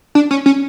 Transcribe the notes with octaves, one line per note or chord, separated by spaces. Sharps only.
D4
C#4
C#4